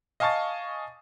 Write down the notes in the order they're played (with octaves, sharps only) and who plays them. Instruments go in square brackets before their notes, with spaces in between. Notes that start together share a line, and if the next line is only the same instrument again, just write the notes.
[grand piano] D#5 F5 G#5 A5 C#6 A6